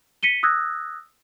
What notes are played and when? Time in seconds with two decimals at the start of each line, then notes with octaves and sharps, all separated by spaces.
0.23 B6 C#7 D#7 G7
0.43 D#6 E6 F#6 G#6 A#6